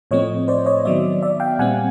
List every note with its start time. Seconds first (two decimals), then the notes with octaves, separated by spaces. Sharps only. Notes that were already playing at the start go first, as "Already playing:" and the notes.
0.11 A2 F3 A3 C4 C#5 D#5
0.48 C5 D5
0.66 C#5 D#5
0.85 D#3 F#3 B3 D5 E5
1.22 D5 E5
1.40 F5 G5
1.59 A#2 G3 C4 F#5 G#5